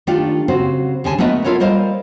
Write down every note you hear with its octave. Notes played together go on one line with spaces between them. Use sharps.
D#3 A3 D4 F4 G4
C#3 C4 F#4 C5
D#2 D3 G#4 G#5 A5
A3 B3 A#4 B4 D#5
E4 F4 A4 A#4 C#5
G3 A#4 C5 D#5 F5